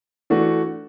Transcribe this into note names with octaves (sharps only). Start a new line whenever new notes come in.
E3 A3 D4 F#4